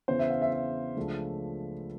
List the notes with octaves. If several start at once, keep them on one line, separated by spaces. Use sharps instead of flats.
E2 C#3 E3 C5
E5
F5
E5
E5
C#2 C#3 F3 A3 D4